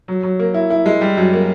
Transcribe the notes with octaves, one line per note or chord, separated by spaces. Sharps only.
F#3
F#3
A#3
E4
E4
G#3
G3
F#2
A#3